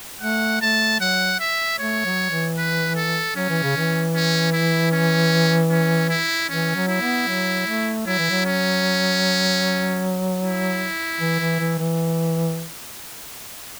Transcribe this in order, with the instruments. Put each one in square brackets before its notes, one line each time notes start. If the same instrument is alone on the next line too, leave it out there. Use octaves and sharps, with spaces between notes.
[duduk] A3 [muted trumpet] F#5
[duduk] A3 [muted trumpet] A5
[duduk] F#3 [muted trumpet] F#5
[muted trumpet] E5
[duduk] A3 [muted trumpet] C#5
[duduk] F#3
E3
[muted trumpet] B4
A4
[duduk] F#3 [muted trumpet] C#4
[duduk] E3
C#3
E3
[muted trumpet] C#4
E4
C#4
C#4
E4
[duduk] E3 [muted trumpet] C#4
[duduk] F#3
[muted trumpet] E4
[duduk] B3
F#3
A3
[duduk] F#3 [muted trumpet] E4
[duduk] E3
F#3
[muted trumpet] C#4
E4
[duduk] E3
E3
E3
E3